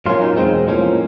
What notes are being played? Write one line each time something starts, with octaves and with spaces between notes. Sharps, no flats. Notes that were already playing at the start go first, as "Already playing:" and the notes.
A#2 F#3 A#3 C#4 F4
D#4
E2 B2 G#3 C4 D#4
A2 F3 A#3 C#4